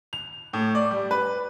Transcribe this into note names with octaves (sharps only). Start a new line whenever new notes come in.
F7
A2
D5
G3
B4